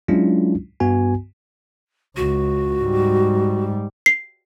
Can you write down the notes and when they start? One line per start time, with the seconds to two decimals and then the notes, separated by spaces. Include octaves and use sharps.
0.08 F#3 G#3 C#4 D4 E4 F4
0.80 G2 B3 F#4 G#5
2.17 C#2 F#4
2.81 G#2 G3
4.06 C7